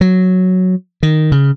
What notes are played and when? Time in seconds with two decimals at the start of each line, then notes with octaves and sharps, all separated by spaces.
0.01 F#3
1.03 D#3
1.32 C#3